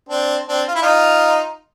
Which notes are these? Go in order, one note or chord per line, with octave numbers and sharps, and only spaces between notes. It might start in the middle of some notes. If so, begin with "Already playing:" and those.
C4 D4
C4 D4
F4
E4
D#4 F4